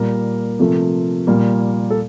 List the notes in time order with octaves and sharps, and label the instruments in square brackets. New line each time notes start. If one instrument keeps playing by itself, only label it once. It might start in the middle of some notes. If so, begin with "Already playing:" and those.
Already playing: [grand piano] A#2 G3 A#3 A#4
C3 F3 A3
A#2 G3 A#3
A4